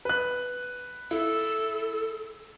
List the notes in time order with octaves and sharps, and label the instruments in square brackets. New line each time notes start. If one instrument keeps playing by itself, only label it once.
[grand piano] B4 F#6
[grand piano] E4 [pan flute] A4